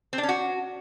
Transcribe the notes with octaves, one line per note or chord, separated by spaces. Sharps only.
C4
D4
C#4
F#4